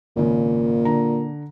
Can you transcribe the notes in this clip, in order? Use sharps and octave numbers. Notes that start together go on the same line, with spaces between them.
G#1 A#2 C#3
D3 A#5